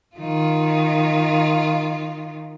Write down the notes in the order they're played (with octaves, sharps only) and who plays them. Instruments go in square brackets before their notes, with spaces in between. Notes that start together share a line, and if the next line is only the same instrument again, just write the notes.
[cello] D#3 F4